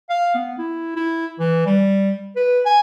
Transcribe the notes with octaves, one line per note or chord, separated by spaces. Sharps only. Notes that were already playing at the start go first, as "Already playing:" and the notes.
F5
B3
E4
E4
E3
G3
B4
G#5